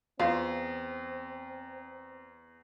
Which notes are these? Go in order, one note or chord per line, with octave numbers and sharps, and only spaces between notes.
E2 C4 F4 C5 F5